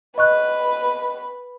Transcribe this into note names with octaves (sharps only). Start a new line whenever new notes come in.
B4 D#5 C#6 F#6